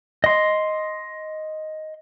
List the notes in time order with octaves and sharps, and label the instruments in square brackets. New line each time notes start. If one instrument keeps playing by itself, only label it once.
[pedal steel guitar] D#5 C6